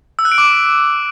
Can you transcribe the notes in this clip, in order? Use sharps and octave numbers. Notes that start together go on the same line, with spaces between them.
E6
F#6
D7
D6